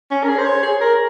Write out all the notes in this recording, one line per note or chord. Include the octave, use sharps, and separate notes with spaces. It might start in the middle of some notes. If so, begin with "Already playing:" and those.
C#4
A#4
G#4
C5
C#5
G#4
A#4